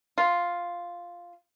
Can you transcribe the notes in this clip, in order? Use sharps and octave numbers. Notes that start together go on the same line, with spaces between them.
F4